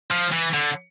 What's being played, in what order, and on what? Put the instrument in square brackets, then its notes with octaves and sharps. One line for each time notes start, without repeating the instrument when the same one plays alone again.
[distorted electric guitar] F3
E3
D3